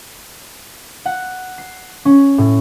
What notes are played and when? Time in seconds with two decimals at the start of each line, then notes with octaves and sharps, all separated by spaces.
1.06 F#5
1.58 C7
2.05 C#4
2.38 A2